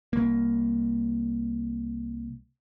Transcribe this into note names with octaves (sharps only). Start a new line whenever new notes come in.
C2 A#3